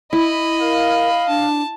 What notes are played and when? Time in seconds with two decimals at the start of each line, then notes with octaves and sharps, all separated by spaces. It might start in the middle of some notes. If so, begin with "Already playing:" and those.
0.13 E4 D#5 B5
0.61 A#4 F5
1.28 D4 A5